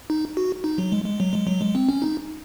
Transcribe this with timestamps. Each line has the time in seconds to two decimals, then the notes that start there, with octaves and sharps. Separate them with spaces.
0.10 D#4
0.37 F#4
0.64 D#4
0.78 F#3
0.92 G#3
1.05 G#3
1.20 F#3
1.33 G#3
1.47 F#3
1.61 G#3
1.75 C4
1.89 C#4
2.02 D#4